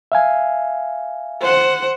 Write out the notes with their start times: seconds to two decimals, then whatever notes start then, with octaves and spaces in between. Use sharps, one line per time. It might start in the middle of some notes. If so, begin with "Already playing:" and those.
0.12 E5 F5 G#5
1.41 C5 F#5